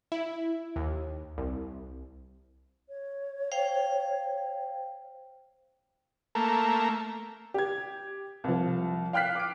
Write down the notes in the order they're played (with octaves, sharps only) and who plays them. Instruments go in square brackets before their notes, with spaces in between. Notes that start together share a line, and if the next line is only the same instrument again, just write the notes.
[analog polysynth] E4
D#2
C2
[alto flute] C#5
[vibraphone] C5 F5 G5
[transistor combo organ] A3 A#3
[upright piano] G4 G#6
C2 F3
F5 G5 F6 F#6 B6 C7
D6 D7